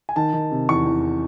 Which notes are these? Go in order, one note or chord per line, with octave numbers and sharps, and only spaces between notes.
G#5
D#3 A5
D#3
C3
E2 C#6
E2